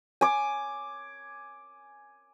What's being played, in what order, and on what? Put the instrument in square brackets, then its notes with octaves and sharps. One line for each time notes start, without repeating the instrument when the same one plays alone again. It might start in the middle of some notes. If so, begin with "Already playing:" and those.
[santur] G#5 D6